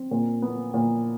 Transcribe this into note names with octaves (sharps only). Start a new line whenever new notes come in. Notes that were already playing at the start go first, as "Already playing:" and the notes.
Already playing: C4
A#2
B3
A#2